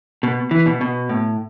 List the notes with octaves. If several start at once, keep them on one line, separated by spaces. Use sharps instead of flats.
B2
E3
B2
B2
A2